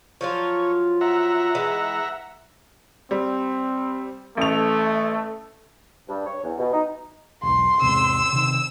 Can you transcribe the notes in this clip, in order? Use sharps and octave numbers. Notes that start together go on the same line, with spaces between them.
F3 F#3 F4 C#5
E5 F#5 A#5
E3 G#3
G3 C4
A1 A3 F7
G2
C#5
E2
B2
D#4
E1 B1 C6
E2 G#2 C3 E6
C3 D#3